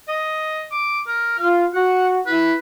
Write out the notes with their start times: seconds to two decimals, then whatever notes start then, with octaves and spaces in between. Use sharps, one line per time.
0.08 D#5
0.72 D6
1.07 A#4
1.39 F4 F5
1.74 F#4 F#5
2.27 E4 B4